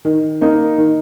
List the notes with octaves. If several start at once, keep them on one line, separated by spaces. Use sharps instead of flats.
D#3
A#3 D#4
D#3